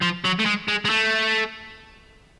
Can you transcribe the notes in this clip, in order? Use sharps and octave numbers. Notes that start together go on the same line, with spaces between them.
F3
F#3
A3
G#3
G#3
G#3
A3